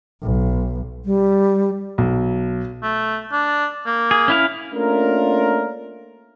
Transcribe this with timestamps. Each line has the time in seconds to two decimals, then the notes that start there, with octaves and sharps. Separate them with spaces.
0.23 B1
1.05 G3
1.98 B1
2.83 A3
3.32 D4
3.86 A#3
4.11 G#4
4.28 C#4 E4 F5
4.74 A3 A#3 C#4 D4 F4 A#4